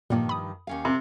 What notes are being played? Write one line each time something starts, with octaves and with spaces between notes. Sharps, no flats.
G2 A#2 D#3 F3 A#3
B5 D#6
D#2 C#4 F5
C3